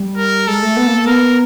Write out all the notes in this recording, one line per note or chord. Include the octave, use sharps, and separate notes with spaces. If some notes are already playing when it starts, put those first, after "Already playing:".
Already playing: G3
A#4
G#3 A4
A3
B3
A#3
A#3
B3 A#4